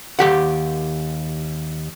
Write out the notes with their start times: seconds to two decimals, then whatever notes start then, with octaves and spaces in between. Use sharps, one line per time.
0.19 D#2 G4 F#5